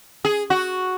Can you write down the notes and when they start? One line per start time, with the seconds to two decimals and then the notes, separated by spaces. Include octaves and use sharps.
0.25 G#4
0.50 F#4